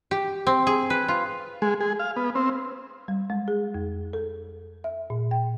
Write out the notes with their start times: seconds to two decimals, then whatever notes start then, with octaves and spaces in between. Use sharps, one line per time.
0.11 G4
0.47 C4
0.67 G#4
0.90 B4
1.08 F4
1.62 G#3
1.81 G#4
2.00 F5
2.16 B3
2.35 C4
3.08 G3
3.30 G#3
3.48 G#4
3.74 F2
4.13 A4
4.84 E5
5.10 A#2
5.31 G5